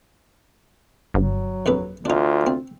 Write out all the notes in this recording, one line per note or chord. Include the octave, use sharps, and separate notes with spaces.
G1 F#3
A#1 F2 B4
D2 D4 D#4 F4
C4